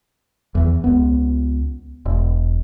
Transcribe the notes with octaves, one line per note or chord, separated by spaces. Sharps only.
E2 E3
C#2 B3
E1